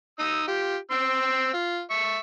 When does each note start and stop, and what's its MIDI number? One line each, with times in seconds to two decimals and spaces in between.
0.19 0.44 63
0.19 0.44 87
0.19 0.44 88
0.48 0.76 65
0.48 0.76 67
0.91 1.50 60
0.91 1.50 84
0.91 1.50 88
1.53 1.81 65
1.90 2.18 76
1.90 2.18 85